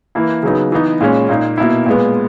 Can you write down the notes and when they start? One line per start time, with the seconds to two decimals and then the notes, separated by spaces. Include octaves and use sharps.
0.15 E3 A#3 E4
0.43 C#3 F#3 B3 D#4
0.72 E3 B3 D#4
1.01 A#2 G#3 C#4
1.29 A#2 A#3 D#4
1.58 B2 A#3 E4
1.86 A#2 G#3 B3